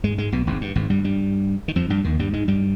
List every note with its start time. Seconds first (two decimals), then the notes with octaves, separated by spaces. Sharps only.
0.04 G#2 G#3
0.18 G#2 G#3
0.32 B1 B2
0.47 G#1 G#2
0.61 G2
0.76 G#1 G#2
0.90 G2 G3
1.04 G2 G3
1.68 D#3
1.76 F2 F3
1.90 G2 G3
2.04 D#2 D#3
2.19 G2 G3
2.33 G#2 G#3
2.48 G2 G3